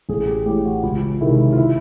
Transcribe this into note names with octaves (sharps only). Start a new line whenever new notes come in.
A1 G#4
G4
A2 E3 G4
F#4
C#2 F4
C3 D#3 G#3 E4
F4
E4